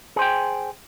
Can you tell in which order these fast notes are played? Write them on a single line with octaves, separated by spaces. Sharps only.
G#4 C5 G5